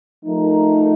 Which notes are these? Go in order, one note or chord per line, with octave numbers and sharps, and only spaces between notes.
F3 A3 D#4 A#4